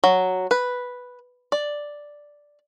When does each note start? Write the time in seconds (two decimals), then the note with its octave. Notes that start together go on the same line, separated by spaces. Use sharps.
0.04 F#3
0.51 B4
1.52 D5